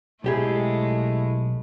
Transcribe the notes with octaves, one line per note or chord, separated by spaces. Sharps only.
B1 G#3 A3 E4 G4 G#4